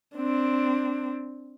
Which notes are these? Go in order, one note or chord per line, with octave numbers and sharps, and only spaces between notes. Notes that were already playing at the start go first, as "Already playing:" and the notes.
C4 D4